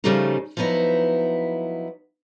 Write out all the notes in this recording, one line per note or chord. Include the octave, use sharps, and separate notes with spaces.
C#3 F3 G3 A3 C#4 D#4
F3 F#3 B3 D#4 E4